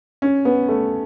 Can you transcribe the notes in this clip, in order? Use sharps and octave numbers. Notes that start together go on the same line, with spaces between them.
C#4
B3
A3